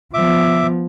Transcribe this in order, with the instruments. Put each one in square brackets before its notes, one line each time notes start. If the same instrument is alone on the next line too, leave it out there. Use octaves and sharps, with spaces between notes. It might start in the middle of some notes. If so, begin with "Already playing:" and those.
[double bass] F3 B3 [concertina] E5 D6